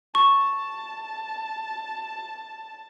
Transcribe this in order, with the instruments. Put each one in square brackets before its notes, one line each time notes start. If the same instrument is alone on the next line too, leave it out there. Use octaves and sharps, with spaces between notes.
[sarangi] A5 [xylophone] C#6